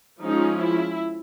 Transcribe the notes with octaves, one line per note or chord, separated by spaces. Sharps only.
F3 G#3 C#4 D#4
E4